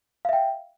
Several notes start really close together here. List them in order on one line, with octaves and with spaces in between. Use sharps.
F5 E5 G5